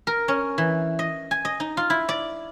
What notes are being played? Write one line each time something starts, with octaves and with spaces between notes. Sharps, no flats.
A#4
C#4
E3
D#5
G#5
D#5
D#4
F4
E4
D5